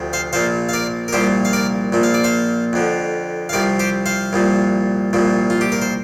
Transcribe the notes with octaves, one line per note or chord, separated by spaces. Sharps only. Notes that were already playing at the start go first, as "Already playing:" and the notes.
Already playing: D2 C3 F3
C5 F5
A#1 A#2 F3 C5 F5
F5
A#4 D5
A#4
C2 A#2 F3 G4 C5
F5
A#4 D5
A#1 A#2 F3
F5
D5
C5 F5
F2 D3 F3
F5
C2 C3 F3 A#4 D5
G4 C5
C5 F5
C2 A#2 F3
C2 A#2 F3
F4
G4
A#4
C5